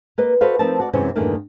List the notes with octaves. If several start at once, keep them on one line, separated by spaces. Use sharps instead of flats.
A#3 B4 D#5
F#4 A4 B4 C5 D#5 F5
F3 A3 C4 D#4 A#4 A5
F#4 D5
F#2 C3 E3 G#3 C#4 C5
E2 G2 A#2 D#3 A3 A#3